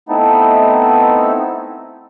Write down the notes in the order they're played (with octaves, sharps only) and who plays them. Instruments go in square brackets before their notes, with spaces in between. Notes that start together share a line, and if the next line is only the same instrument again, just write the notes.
[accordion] A3 B3 C4 D#4 E4 A4